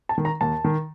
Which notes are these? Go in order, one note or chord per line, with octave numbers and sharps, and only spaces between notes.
A5
D#3
A#5
D#2 A5
D#3